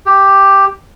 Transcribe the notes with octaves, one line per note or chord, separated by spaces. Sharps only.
G4